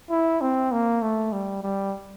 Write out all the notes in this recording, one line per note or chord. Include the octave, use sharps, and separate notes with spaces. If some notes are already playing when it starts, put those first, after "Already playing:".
E4
C4
A#3
A3
G3
G3